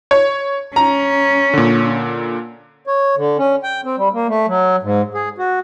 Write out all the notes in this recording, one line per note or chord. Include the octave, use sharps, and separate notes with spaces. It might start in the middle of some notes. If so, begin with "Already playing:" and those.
C#5
C#4 A#5
A#2 D3
C#5
D3
C#4
G5
C4
G3
A#3
A3
F#3
G#2
G#4
F#4